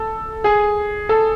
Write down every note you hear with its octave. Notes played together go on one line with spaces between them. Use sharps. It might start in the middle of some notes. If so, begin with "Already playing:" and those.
Already playing: A4
G#4
A4